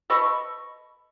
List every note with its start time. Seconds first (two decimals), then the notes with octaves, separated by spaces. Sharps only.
0.10 A4 B4 D#5 C#6